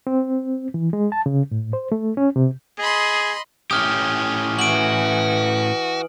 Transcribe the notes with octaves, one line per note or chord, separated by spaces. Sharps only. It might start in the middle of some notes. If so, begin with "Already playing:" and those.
C4
E3
G#3
A5
C#3
A2
C5
A3
C#4
C3
G#4 D#5 B5 C6
A2 C#4 G4 D#6 F6 G7
E3 F#4 D7 F#7